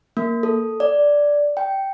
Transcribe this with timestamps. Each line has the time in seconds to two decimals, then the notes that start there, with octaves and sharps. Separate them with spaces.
0.17 A#3
0.43 A4
0.80 D5
1.57 G5